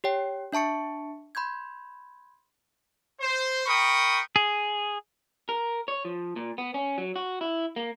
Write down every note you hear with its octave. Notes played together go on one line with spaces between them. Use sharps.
G4 C#5 G5
D4 E5 A5 C#6 C#7
B5 C6 G6 G#6
C5
A#4 G5 B5 C#6 D#6
G#4
A#4
C#5
F3
A#2
B3
C#4
F#3
F#4
E4
A#3